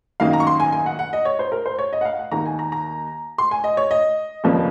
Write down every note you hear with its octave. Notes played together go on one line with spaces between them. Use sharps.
F#2 D#3 A#3 D#4 F5
A#5
C#6
C6
G#5
G#5
F#5
F#5
D#5
C#5
C5
A#4
C5
C#5
D#5
F#5
F5
F#5
D#2 D#3 A#3 D#4 A#5
G#5
A#5
A#5
C6
G#5
D#5
C#5
D#5
F1 D#2 C#3 F3 A#3